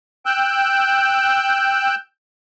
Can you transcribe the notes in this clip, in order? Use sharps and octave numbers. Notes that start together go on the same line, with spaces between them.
G5 E6 F#6 G6